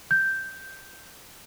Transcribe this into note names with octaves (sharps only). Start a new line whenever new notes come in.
G6